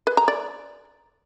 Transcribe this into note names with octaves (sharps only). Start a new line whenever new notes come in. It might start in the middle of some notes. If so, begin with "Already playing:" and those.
B4
A#5
D5